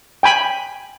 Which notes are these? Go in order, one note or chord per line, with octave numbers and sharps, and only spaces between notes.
G5 G#5 B5